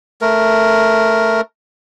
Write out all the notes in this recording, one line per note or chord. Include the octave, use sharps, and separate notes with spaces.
A3 A#4